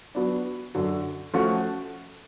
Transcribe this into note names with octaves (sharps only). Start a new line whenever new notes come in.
F#3 B3 D4
F#2 D3 F#3
F3 A3 C#4 F#4